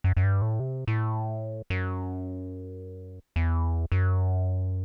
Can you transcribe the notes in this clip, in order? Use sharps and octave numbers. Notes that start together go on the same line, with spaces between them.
F#2
F#2
G2
A2
C3
A2
F#2
E2
F#2